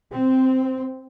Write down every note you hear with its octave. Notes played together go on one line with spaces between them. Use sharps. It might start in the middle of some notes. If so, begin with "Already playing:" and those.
C4